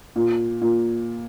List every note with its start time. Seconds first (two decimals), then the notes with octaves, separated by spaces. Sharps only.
0.16 A#2
0.61 A#2